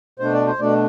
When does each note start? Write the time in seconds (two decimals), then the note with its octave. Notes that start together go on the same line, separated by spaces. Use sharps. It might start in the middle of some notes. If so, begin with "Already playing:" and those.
0.19 B2 A3 D4 C5
0.33 D5
0.47 C5
0.59 B2 A3 D4 D5